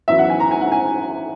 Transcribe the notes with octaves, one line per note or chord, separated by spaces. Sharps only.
F#2 E3 B3 E5
F#5
G#5
A#5
G#5
F#5
G#5